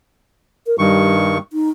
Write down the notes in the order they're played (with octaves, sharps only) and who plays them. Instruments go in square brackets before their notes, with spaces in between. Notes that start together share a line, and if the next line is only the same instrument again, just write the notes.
[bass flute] A#4
[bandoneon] G2 D#3 C#6 [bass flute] G3
[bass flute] D#4